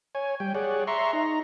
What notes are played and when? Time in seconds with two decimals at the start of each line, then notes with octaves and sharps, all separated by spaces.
0.15 C#5 G#5
0.40 G3 G5
0.55 G#4 C#5 D5 F#5
0.87 E5 A#5 C6 C#6
1.13 D#4 A#5